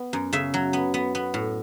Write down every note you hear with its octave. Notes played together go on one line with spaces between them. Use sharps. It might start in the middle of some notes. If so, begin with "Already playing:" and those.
Already playing: B3
F#2
C#3 E5
F#3
B3
B3
B3
A2